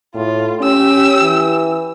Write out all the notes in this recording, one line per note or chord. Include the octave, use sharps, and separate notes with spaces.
A2 F4
C#4 G4 E6
E3